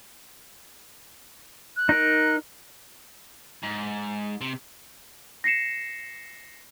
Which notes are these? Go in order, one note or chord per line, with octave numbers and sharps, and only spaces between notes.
F#6
D#4 A#4
G#2
C3
A#6 C7 C#7 E7